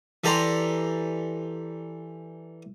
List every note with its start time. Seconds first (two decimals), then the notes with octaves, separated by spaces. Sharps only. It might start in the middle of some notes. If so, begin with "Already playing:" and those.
0.24 E3 G4 A4 D5 A#5 C6